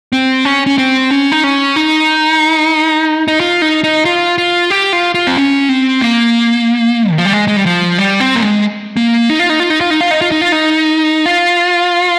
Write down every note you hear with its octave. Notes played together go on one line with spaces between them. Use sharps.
C4
C#4
C#4
C4
C#4
D#4
C#4
D#4
D#4
F4
D#4
D#4
F4
F4
G4
F4
F4
C4
C#4
C4
A#3
D#3
F3
G3
G#3
G#3
G3
F3
G3
C4
A#3
G#3
A#3
D#4
F4
D#4
F4
D#4
F4
D#4
F4
D#4
F4
D#4
F4
D#4
F4